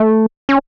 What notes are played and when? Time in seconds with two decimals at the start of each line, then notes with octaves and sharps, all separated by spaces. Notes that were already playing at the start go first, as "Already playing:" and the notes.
Already playing: A3
0.49 C#4